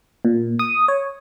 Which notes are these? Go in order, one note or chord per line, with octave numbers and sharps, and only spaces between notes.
A#2
D#6
C#5